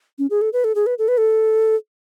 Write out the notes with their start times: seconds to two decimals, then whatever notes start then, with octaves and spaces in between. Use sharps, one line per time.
0.19 C#4
0.30 G#4
0.41 A4
0.53 B4
0.64 A4
0.75 G#4
0.86 B4
0.99 A4
1.08 B4
1.18 A4